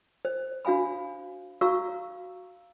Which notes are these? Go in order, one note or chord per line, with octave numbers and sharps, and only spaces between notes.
C5
D4 F#4 F5 G#5 B5
F#4 F5 A#5 C#6 E6